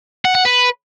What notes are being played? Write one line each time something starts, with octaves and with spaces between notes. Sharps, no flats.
F#5
F#5
B4